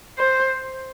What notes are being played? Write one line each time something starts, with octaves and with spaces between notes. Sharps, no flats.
C5